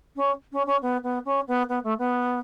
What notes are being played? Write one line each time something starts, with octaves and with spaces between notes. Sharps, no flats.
C#4
C#4
C#4
B3
B3
C#4
B3
B3
A3
B3